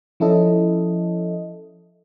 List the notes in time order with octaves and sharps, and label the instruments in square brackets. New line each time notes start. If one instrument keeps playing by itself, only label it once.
[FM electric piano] F3 C#4 E4 A4 D#5